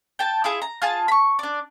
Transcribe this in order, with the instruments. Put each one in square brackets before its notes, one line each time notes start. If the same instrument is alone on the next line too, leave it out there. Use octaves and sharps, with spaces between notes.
[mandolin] G5 A5
E4 F4 G#4 E5
A#5
F4 G#4 A5
B5 C#6
D4 D5